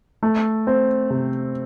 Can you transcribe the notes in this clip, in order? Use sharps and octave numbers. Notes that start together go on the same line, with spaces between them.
A3
C4
C3